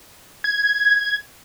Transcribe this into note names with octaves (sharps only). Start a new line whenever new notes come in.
G#6